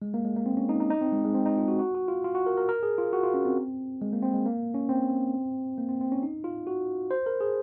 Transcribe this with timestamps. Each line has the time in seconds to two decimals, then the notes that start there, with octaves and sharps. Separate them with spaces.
0.02 G#3
0.14 A#3
0.25 G#3
0.36 A#3
0.46 C4
0.57 C#4
0.69 D#4
0.80 D#4
0.90 D#4
1.01 C4
1.13 G#3
1.25 G#3
1.35 C4
1.46 D#4
1.58 F4
1.68 F#4
1.79 F#4
1.95 F#4
2.08 F4
2.24 F4
2.35 F#4
2.46 A#4
2.57 A#4
2.69 A#4
2.83 G#4
2.98 F4
3.13 F#4
3.23 F4
3.34 C#4
3.45 C4
4.02 G#3
4.13 A#3
4.23 C4
4.34 G#3
4.46 A#3
4.75 C#4
4.89 C4
5.78 A#3
5.89 C4
6.01 C4
6.12 C#4
6.23 D#4
6.44 F4
6.67 F#4
7.11 C5
7.26 A#4
7.41 G#4